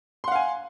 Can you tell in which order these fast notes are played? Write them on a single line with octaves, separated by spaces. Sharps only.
C6 F#5 F5 G#5